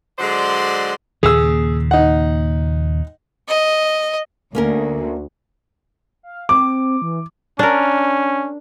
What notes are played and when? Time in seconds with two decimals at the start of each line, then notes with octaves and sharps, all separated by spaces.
0.18 D3 F#3 G#3 C5 D5 C6
1.23 D#2 A#2 C#3 G#4 E6
1.91 D#4 F#5
3.48 D#5
4.55 D2 A#3 C#4 A#4
6.23 F5
6.49 C4 D6
7.02 E3
7.59 C#4 D4 A#4